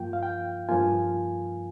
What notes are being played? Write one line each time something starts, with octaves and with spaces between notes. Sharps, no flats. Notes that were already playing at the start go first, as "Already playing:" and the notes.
Already playing: G2 F3 A#3 F4 G5
F5
G5
G2 F3 A#3 F4 G#5